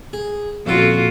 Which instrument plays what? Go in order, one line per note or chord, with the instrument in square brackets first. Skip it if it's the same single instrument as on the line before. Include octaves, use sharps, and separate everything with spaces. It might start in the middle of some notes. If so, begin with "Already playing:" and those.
[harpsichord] G#4
[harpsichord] F2 C#3 A4 [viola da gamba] A#2 F4 F#4